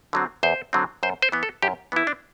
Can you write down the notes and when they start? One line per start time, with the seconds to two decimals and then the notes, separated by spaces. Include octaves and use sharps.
0.13 D3 F#3 C4
0.43 E2 C5
0.73 D3 F#3 C4
1.03 F#2 C5
1.22 C5
1.32 E3 B3
1.43 A4
1.62 F#2 G4
1.92 E3 B3 E4
2.07 D4